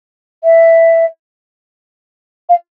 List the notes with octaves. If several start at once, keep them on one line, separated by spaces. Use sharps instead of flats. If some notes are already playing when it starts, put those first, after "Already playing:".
E5
F5